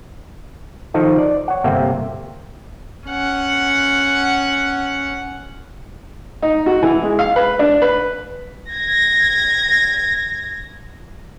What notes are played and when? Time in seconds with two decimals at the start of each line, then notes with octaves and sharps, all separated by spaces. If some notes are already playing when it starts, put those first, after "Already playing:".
0.94 D#3 F3 D#4 A4 A5
1.18 D5
1.48 C#5 F#5
1.64 G1 C3 A#3 E5 G5
3.07 C#4 F#5
6.42 D#4
6.66 F#4
6.83 E3
7.03 G#3
7.19 F5
7.36 B4
7.59 D4
7.82 B4
8.69 G#6 A#6